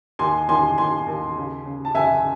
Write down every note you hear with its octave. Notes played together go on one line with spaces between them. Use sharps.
D#2 G#5 C6
D#2 G#5 C6
D#2 G#5 C6
D#2
C#3
C#3
A5
F#1 E5 G#5